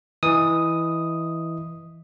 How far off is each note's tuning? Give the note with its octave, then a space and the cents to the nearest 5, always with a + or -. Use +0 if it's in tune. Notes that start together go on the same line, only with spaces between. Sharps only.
E3 -5 D#5 +0 D#6 +0